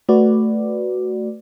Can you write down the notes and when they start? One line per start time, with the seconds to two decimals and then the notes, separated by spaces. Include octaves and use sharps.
0.09 A3 F#4 B4 D5